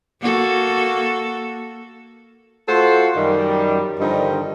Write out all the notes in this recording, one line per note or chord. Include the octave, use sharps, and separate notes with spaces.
A#3 F#4 A4
A3 F4 F#4 A4 C5 C6
F#2 D#3 G3
G2 D3 D#3 F3 G3 D#4